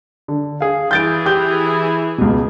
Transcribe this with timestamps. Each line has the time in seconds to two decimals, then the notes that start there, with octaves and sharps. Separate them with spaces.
0.28 D3
0.61 G#4 F5
0.91 E3 E4 G#4 G6 A6 D7
1.26 G4 G6
2.18 C#2 B2